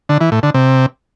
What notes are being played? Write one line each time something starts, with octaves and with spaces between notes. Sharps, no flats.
D3
E3
A2
D3
C3